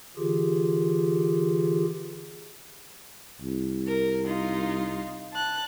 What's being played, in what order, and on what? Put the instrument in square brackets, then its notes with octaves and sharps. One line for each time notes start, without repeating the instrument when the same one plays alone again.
[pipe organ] D3 E3 F4 G4 G#4
[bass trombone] C2
[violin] A#4
D#4 F4
A5 F#6